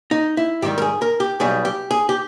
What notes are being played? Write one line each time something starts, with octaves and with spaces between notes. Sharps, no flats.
D#4
E4
G#2 D#3 G3 G4
A#4
G#4
A#4
G4
B1 B2 G3 G#4
G4
G#4
G4